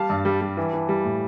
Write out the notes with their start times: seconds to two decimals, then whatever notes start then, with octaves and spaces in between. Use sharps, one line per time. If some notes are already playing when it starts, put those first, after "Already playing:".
Already playing: G3 F5 A5
0.10 G2
0.25 G3
0.41 G3
0.57 E3
0.73 E3
0.89 G3
1.05 A2